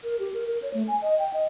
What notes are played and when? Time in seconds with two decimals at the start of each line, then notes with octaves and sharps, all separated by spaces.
0.04 A#4
0.19 G4
0.34 A#4
0.47 A#4
0.62 C#5
0.74 A3
0.88 G#5
1.02 D#5
1.19 G5
1.33 D#5